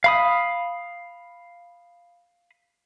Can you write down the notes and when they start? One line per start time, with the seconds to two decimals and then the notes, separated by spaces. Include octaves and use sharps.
0.04 F5 B5 D#6